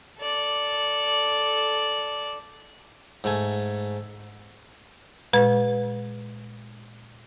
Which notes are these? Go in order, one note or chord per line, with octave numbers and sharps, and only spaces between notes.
A4 D5
G#2 A3 G#5
A#2 G#3 B4